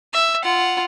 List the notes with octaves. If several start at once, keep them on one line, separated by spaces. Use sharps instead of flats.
E5
F4 F#5